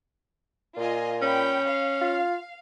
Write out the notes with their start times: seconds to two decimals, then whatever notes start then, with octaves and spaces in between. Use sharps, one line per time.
0.77 A#2 F4 D#5 G#5
1.22 C#4 G5 B5
1.66 F5
2.01 F4